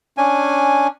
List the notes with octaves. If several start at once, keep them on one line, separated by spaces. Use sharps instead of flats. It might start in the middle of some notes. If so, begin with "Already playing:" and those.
C#4 D4 G#5